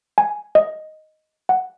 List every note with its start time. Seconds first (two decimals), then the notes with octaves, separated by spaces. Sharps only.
0.18 G#5
0.55 D#5
1.49 F#5